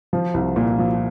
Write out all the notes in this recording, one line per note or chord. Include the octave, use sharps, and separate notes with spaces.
F3
C2
A#2
F3